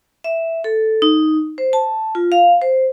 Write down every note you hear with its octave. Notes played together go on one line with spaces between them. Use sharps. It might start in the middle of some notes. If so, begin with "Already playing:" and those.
E5
A4
D#4
C5
A5
F4
F5
C5